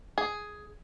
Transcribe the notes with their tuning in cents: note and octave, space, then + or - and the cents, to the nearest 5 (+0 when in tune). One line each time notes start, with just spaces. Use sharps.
G#4 +5